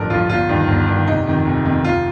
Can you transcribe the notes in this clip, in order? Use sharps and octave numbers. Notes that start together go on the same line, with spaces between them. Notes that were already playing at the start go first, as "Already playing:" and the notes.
Already playing: A1 G2 D3 F3 A4 A#4
G2 D3 F3 F4
G1 F4
G2 D#3
G1
G2 D#3
F1 D#4
F2 D#3
F1
F2 D#3
F1 F4